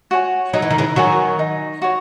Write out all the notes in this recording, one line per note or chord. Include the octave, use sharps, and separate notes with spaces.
F#4 C#5 G#5
F#3 D#4
E3
D#3
C#3 E3
D#3 F#3 F#4 C#5 G#5
D#4
F#4 C#5